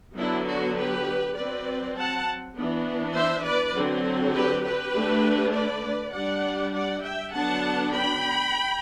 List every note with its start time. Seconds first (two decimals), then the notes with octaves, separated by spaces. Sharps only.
0.17 D3 F#3 B3 D4 E4
0.47 D4 F#4
0.77 G4 B4
1.37 F#3 C4 B4 D5
1.96 F#5 A5
2.56 E3 B3 D4
3.16 C5 E5
3.45 B4 D5
3.76 D3 F#3 C4
4.35 G4 B4
4.65 G4 B4
4.95 D3 A3 D4
5.55 B4 D5
6.15 G3 D4 D5 F#5
6.74 D5 F#5
7.04 E5 G5
7.34 D3 F#3 B3 D4 F#5 A5
7.94 G5 B5